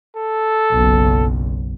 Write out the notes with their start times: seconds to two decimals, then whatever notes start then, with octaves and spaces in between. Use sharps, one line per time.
0.16 A4
0.72 F#1 B1